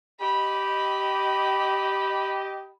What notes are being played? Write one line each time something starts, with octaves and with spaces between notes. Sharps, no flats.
G4 D#5 B5